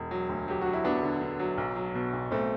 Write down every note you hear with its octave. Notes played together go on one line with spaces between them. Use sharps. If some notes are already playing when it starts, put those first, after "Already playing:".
Already playing: E1
F#3
D2
F#3 G4
F#3 F#4
E4
F#3 B3 D4
D3
D3
F#3
B1
F#3
B2
B1
B1 A3 C4